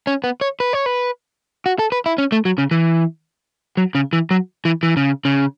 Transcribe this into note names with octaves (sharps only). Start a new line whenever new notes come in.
C#4
B3
C#5
B4
C#5
B4
F#4
A4
B4
E4
C#4
A3
F#3
C#3
E3
F#3
C#3
E3
F#3
E3
E3
C#3
C#3